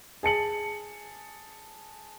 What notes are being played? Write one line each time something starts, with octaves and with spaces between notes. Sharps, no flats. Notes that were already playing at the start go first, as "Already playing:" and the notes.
G#4 A5 C#7 F#7